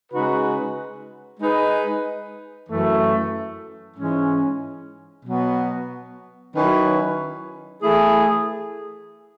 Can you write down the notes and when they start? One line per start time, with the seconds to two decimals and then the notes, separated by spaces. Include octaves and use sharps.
0.12 C#3 G#3 D#4 F#4 B4
1.40 G#3 D#4 G#4 B4
2.68 F#2 E3 A3
3.97 G#2 E3 G#3 C#4
5.25 B2 F#3 B3 F#4
6.54 D#3 F#3 C#4 E4 B4
7.82 E3 A3 E4 G#4